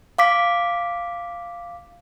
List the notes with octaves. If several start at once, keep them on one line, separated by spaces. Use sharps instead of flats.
F5 D6 B6